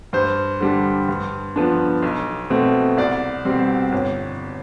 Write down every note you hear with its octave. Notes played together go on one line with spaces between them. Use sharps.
G2 C5
D3 G3 D4
G2
F3 B3 D4
B1
B2 A3 C4
C2 D5
B2 G3 C4
G1